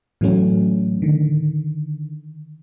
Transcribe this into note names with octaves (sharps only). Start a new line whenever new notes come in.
A2 E3 F#3 A3 C#4
D3 D#3